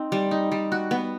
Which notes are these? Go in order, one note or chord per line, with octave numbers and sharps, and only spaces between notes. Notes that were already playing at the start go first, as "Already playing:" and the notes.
Already playing: C4 D#4
G3
D#4
G3
F#4
B3